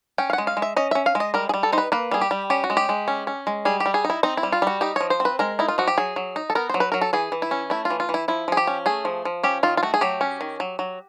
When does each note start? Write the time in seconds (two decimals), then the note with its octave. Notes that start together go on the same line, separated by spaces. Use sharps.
0.18 C#4 G5
0.30 F5
0.33 G#3 F#5
0.47 F5
0.57 G#3
0.62 E5
0.76 C#4 D#5
0.91 C#4 E5
1.06 F5
1.15 G#3
1.20 D#5
1.34 G3 A#4
1.49 G#4
1.54 G3
1.63 A4
1.73 D#4 C5
1.78 B4
1.92 A#3 B4
2.11 G3 G#4
2.21 G4
2.31 G3
2.50 C#4 G4
2.64 F#4
2.70 G#3
2.77 G4
2.89 G#3
3.08 C#4
3.27 C#4
3.47 G#3
3.65 G3 G#4
3.80 G4
3.86 G3
3.94 G#4
4.05 D#4
4.10 E4
4.23 C4 D#4
4.37 E4
4.43 G3
4.52 F4
4.62 G3 F#4
4.81 D#4 G4
4.96 F3 C#5
5.10 C5
5.20 C4
5.25 B4
5.39 G#3 A#4
5.59 D#4 E4
5.68 F4
5.78 F3 F#4
5.87 G4
5.98 F#3 G#4
6.16 F#3
6.36 D#4
6.50 A4
6.55 B3 A#4
6.69 F#3 C5
6.80 B4
6.92 F#3 A#4
7.01 A4
7.13 E3 G#4
7.32 E3
7.42 E4
7.51 C#4
7.70 A3 E4
7.85 F4
7.90 E3
8.00 F4
8.09 E3
8.14 E4
8.28 F3 E4
8.48 F3 G#4
8.57 G4
8.67 C#4
8.86 A3 G#4
9.05 F3
9.25 F3
9.43 C#4 G4
9.63 D#3 F4
9.77 F4
9.83 A3 F#4
9.94 G#4
10.01 F#3 G4
10.21 C#4
10.41 D#3
10.60 F#3
10.79 F#3